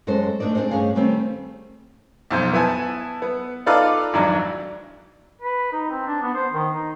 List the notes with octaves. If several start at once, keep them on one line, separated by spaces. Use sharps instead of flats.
F#2 G#3 C#4 A4 C5
A3 A#3 D4 D#4 D5
C4 D4 F4 G#4 C5
G2 C#4 D#4 G#4 F5
D#3 G3 A3 C4 C#4
B1 F2 C5
B3 E4 G#5 A5
B3
D#4 F4 A4 B4 D5 F5
G#1 F2 F#3 D4
B4
D#4
C4
D4
B3
C5
D#3
D#4